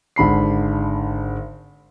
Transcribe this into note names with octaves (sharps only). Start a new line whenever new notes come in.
G#1 D3 B5 C7